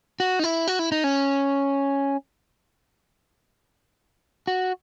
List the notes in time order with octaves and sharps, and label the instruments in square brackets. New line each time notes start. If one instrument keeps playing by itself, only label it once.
[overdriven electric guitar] F#4
D#4
E4
F#4
E4
D#4
C#4
F#4